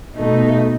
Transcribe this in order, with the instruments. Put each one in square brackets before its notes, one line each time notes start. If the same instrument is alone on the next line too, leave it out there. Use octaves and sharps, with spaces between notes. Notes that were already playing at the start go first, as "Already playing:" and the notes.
[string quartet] B2 A3 D#4